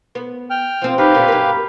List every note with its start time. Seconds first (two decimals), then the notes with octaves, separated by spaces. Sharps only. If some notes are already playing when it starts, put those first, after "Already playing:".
0.15 B3
0.50 G5 F6
0.82 F3 C4
0.98 D#4 G4 B4 F5
1.15 A#2 D3 A#3
1.28 F#2 A#3